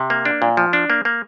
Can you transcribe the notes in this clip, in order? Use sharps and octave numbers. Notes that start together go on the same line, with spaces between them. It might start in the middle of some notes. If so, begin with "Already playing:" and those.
Already playing: C3
A#3
D4
A#2
F3
D4
A#3
A#3